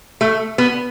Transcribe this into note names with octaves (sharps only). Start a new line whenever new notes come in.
A3
B3